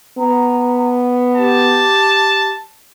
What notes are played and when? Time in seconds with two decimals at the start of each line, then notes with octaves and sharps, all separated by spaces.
0.18 B3 A#5
1.36 G4 A5